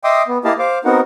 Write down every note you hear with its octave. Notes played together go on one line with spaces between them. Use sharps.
D#5 E5 G5 C6 D6 D#6
B3
A#3 E4 G4 D#5 F5 A5
C5 F5 D6
B3 C4 D#4 F#4 A#4 F#5